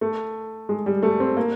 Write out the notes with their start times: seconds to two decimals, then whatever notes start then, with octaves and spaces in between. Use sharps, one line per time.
0.01 A3
0.69 G#3
0.86 G3
1.03 A3
1.20 C4
1.37 A#3